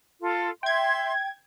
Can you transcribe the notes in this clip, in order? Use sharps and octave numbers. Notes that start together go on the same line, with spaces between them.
F4 A4
E5 G5 C6 G#6